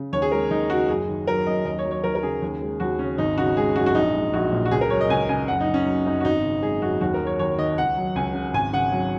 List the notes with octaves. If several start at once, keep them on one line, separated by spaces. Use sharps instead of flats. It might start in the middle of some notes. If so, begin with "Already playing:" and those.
Already playing: C#3
D#2 C#5
G#4
G#3 A#4
D#2 D#4
C#3 F#4
F#1 G#4
D#3
F#3 A#4
F#2 D#5
D#2 D#5
C#5
F#3
C#5
D#2 A#4
A#4
C#3 G#4
D#2
G#3
D#2 F#4
C#3 C#4
G#1 D#4
C#3 F#4
G#3 G#4
F#2 F#4
F#4
A#1 D#4
G#3
A#1 F#4
A#2
F#4
C#2 G#4
A#4
F#3 C#5
D#5
C#2 G#5
C#3 G#5
F#1 F#5
D#4
C#3
C#4
F#3
F#2 D#4
F#4
G#1 D#4
C#3
G#3 G#4
F#2 F#4
D#2 F#4
A#4
F#3
C#5
D#2 C#5
D#3 D#5
C#2 F#5
F#3
C#2 G#5
C#3
G#1 G#5
C#3 F#5
F#3